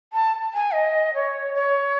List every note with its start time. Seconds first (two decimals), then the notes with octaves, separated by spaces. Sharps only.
0.13 A5
0.54 G#5
0.74 D#5
1.14 C#5
1.55 C#5